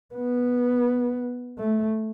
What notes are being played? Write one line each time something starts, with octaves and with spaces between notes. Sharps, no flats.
B3
A3